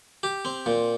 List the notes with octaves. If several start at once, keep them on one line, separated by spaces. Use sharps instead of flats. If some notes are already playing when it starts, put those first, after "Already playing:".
G4
C4
A#2